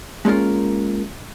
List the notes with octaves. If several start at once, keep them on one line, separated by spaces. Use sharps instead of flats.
G#3 A#3 C#4 F4 A#4